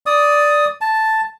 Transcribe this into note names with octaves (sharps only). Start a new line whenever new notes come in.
D5 D#6
A5